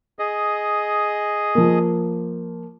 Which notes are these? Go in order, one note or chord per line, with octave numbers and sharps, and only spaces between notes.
G#4 D#5
F3 A#3